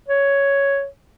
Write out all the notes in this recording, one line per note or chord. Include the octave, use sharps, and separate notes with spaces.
C#5